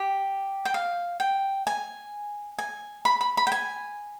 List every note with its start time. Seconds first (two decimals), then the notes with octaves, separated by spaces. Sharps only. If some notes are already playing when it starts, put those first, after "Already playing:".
Already playing: G4
0.65 G5
0.74 F5
1.20 G5
1.67 G#5
2.58 G#5
3.05 B5
3.21 B5
3.37 B5
3.47 G5
3.52 G#5